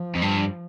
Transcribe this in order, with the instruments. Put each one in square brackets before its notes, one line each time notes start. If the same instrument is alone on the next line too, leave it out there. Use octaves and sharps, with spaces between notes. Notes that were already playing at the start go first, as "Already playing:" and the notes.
Already playing: [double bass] F3
[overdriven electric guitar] F2
G2